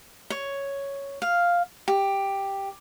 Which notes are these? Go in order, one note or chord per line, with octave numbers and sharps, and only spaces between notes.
C#5
F5
G4